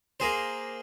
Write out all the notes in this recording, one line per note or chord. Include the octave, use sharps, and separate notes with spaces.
A#3 G#4 C5